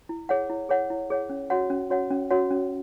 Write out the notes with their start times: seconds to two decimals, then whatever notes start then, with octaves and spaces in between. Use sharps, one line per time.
0.09 E4
0.29 G#4 C#5 F#5
0.50 E4
0.69 G#4 C#5 F#5
0.90 E4
1.10 G#4 C#5 F#5
1.30 C#4
1.50 F#4 C#5 F#5
1.70 C#4
1.90 F#4 C#5 F#5
2.11 C#4
2.31 F#4 C#5 F#5
2.51 C#4